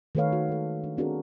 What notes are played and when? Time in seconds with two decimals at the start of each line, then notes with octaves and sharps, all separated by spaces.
0.15 D#3 A3 A4 B4 C#5 F5
0.33 F#4
0.49 G#3 A4
0.84 D4
0.97 B3 C4 D4 F#4 G#4 A#4